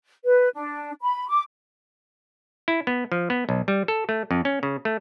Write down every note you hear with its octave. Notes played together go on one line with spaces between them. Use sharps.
B4
D4
B5
D6
E4
B3
F3
B3
B1
G3
A4
A3
F2
C#4
C#3
A3